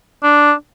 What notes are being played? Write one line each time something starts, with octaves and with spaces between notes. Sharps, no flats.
D4